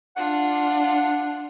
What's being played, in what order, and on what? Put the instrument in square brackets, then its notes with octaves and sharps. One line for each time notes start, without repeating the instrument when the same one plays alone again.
[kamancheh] D4 F4 [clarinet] F#5